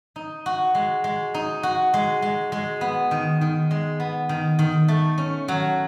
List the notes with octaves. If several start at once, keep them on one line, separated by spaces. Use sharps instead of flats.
D#4
F#4
G#3
G#3
D#4
F#4
G#3
G#3
G#3
B3
D#3
D#3
G#3
B3
D#3
D#3
A3
C#4
F#3